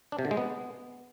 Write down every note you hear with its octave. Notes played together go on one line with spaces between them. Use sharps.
D4
C3
D3
G#3
B3